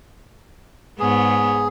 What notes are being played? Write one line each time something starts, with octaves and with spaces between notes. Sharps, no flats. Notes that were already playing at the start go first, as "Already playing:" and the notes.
G#2 B3 G#4 C#5